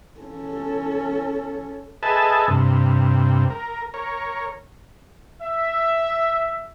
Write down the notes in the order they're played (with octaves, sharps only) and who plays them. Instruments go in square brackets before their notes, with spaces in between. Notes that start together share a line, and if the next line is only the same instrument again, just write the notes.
[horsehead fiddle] C#4 A4
[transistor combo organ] G#4 A4 B4 D#5 E5 A5
G2 C3
A#4
A#4 C#5
[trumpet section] E5